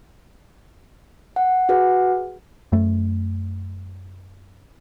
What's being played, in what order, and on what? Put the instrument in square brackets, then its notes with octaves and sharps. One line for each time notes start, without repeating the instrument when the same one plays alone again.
[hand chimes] F#5
F#4 G#4 B4 F#5
[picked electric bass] F#2 A3